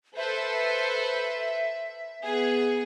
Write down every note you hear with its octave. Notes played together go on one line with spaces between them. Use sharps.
A4 B4 C5 E5
B3 G#4